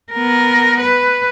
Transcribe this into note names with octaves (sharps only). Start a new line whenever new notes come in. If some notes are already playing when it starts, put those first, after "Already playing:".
B3 A#4
B4